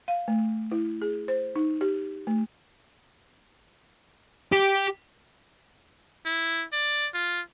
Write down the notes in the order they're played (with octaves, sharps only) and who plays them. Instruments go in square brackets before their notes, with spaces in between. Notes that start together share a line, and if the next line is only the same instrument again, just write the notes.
[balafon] F5
A3
E4
G#4
C5
D#4
G4
A3
[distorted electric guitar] G4
[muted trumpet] E4
D5
F4